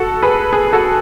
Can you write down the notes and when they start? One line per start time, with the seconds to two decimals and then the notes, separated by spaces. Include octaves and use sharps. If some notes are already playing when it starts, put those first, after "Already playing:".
Already playing: F#4 A4
0.22 G#4 B4
0.53 G#4 B4
0.73 F#4 A4